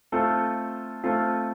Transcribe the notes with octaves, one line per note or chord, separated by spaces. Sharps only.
A3 C4 F4 A4
A3 C4 F4 A4